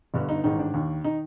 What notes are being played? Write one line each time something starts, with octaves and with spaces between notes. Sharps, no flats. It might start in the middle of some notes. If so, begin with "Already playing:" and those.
G1 G2 D3
D#4
A1 G#2 D#3 D#4
D4
D#2 D#3
D#3 D#4